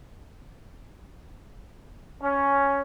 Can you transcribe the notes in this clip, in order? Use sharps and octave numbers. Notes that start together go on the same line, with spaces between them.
C#4